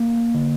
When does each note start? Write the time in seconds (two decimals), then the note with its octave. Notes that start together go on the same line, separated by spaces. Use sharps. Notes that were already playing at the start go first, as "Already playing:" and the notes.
Already playing: A#3
0.34 D3